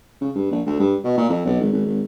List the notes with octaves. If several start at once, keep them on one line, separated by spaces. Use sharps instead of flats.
C#3
G2
A#1
D2
G2
B2
A#2
F2
B1
G#1
G#1
G#1